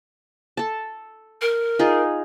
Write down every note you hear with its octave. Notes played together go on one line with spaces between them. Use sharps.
A4 A5
A#4
D#4 F4 G#4